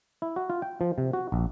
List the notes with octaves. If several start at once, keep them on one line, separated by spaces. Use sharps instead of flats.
E4
F#4
F4
G5
F3
C3
F#4
A#1